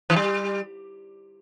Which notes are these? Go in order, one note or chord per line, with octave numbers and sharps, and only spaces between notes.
E3
G3